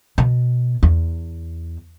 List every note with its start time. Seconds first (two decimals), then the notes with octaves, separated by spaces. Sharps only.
0.18 B2
0.83 E2